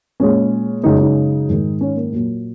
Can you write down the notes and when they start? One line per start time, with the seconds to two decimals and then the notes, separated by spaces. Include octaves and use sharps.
0.20 A#2 G#3 C#4
0.83 F#2 C#3 G#3 D#4
1.00 D#4
1.49 G#2 D#3 G#3
1.81 C#4
1.96 A#3
2.12 A#2 F#3 A#3